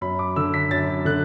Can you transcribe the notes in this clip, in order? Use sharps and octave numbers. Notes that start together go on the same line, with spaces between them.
F#2 B5
D6
D3 E6
B6
F#2 A6
D3 F#6